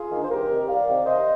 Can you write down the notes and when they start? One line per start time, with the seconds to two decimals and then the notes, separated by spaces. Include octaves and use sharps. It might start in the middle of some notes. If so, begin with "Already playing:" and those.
Already playing: F4 G#4
0.11 D#3 A#3 D4
0.23 C5
0.30 C2 G4 A#4
0.50 C3 D#3
0.68 C2 D5 F5
0.87 C3 D#3
1.06 C3 C5 D#5